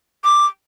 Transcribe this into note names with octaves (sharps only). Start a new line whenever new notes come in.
D6